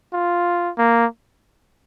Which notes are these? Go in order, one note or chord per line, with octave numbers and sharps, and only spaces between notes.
F4
A#3